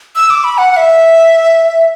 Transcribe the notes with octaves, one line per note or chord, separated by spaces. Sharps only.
E6
D6
B5
F#5
F#5
E5